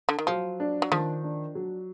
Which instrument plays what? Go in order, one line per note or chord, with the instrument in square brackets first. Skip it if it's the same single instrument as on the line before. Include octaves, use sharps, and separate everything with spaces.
[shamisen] D3
D#3
[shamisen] F3 [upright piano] F#3
[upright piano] D4
[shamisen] F#3
[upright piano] D#3 [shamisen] F3
[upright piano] D4
F#3